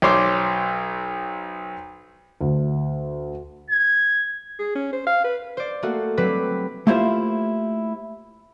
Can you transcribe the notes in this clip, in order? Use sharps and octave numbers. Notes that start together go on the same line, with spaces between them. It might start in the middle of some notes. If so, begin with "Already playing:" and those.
B1 C5 C#5 C6 D6
D2
G#6
G#4
C#4
C5
F5
B4
C5 D5
A3 A#3 F#4
F#3 G3 C4 B4 D6 B6
A3 A#3 E4 F4 G4 C5